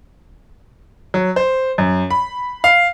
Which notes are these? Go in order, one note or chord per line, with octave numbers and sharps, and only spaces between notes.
F#3
C5
F#2
B5
F5